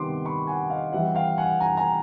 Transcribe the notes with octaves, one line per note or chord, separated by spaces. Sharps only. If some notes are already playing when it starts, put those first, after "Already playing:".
Already playing: C3 D#3 G3 B3 C6 D6
B5 C#6
F#5 G#5
D#5 F5
E3 G3 C4 E5 F#5
F5 G5
F#5 G#5
G#5 A#5
G#5 A#5